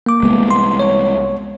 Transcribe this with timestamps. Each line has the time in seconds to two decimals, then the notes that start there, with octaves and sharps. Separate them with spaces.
0.06 A#3 D6
0.23 C2 G#3 B3
0.51 C6
0.79 C#5